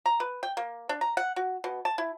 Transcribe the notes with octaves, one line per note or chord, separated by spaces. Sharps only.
A#5
B4
G5
A#3
D4
A#5
F#5
F#4
B2
A5
E4